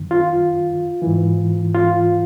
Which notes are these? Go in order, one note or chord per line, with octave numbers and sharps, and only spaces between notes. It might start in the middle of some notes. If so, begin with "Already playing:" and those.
Already playing: F#2 D#3
F4
G#2 E3
F4